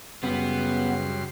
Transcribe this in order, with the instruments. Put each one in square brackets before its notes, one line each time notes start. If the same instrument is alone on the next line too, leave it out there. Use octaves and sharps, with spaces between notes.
[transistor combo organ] F#2 G3 C6 [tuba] C#3 [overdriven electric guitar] B3